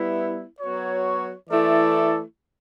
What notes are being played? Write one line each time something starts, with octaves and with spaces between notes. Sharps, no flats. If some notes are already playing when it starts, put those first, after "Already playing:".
Already playing: G3 B3 E4
F#3 B3 F#4 C#5
E3 A3 E4 A4 D5